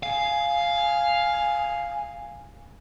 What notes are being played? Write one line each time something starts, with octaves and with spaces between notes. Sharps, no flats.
F5 G#5